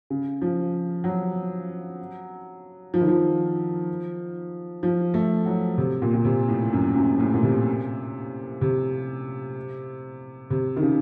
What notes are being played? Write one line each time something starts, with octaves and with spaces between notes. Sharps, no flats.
C#3
F3
F#3
F3
D#3
F3
F3
A3
F#3
C3
A#2
A#2
C3
A2
F#2
F#2
A2
A#2
C3
C3
C3
D#3
C#3